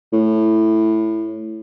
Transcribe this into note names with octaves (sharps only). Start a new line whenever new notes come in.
A2